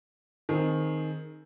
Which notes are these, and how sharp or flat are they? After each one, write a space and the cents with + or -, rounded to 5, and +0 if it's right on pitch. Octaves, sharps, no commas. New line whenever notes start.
D#3 +0 C4 +0 G#4 +20